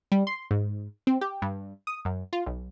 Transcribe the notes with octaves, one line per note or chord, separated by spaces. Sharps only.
G3
C6
G#2
C4
G4
G2
D#6
F#2
F4
B1